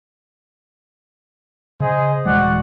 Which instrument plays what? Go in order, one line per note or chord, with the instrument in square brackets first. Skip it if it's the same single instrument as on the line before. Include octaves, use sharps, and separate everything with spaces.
[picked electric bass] C#3 [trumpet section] G#4 C5 D#5
[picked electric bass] D#1 E3 G#3 [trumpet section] F#4 D5 F#5